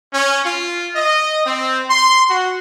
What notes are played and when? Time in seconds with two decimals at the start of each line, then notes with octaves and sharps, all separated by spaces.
0.12 C#4
0.44 F4
0.94 D#5
1.45 C4
1.87 C6
2.28 F#4